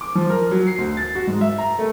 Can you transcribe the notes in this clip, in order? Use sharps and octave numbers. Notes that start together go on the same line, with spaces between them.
D6
F3
A#4
F#3
C7
D2
A6
F#4
G#2
E5
A#5
A3